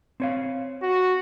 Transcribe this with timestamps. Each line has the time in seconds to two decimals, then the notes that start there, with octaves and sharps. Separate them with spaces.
0.20 C4 C#5 F5
0.82 F#4